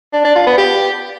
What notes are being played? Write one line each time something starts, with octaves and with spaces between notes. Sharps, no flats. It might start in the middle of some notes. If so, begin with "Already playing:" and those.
D4
D4
F4
B3
G4